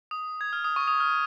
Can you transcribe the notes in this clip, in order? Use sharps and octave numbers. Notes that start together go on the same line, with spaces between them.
D#6
G#6
F6
D#6
C#6
D#6
F6